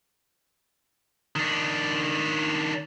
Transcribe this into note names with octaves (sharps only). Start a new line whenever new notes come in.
D#3 D4